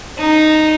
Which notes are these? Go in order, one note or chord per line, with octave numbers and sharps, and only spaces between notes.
D#4